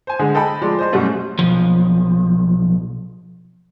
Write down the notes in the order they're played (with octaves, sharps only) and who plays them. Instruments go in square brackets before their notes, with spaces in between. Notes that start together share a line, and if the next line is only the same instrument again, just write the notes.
[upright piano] C5 G#5
D3 G#3 G#4
A4 D#5 G5 A5 B5
F3 G#3 D5 C6
C5 D#5 C6
F#2 B2 G3 A3 C#4
[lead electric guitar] B1 F3